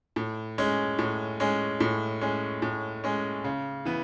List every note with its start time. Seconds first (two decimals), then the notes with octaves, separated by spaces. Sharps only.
0.16 A2
0.58 G#3 C#4
0.99 A2
1.40 G#3 C#4
1.80 A2
2.21 G#3 C#4
2.62 A2
3.04 G#3 C#4
3.44 C#3
3.85 E3 B3